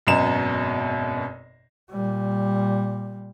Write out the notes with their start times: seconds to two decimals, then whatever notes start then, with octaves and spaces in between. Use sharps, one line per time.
0.07 G#1 F#2 B2 D#5 A#5 E7
1.90 A#2 G3